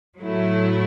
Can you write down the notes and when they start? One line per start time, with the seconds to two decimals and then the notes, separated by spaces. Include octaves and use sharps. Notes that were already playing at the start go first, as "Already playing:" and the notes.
0.21 A2 F#3 A3 E4